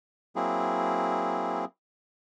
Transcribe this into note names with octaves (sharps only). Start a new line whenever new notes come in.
F#3 A#3 C4 E4 G#4